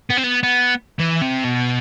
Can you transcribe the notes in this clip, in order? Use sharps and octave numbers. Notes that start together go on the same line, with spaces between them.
B3
C4
B3
B3
E3
C3
B2